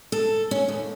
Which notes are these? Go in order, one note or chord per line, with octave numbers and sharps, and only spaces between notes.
A4
C#4
D#2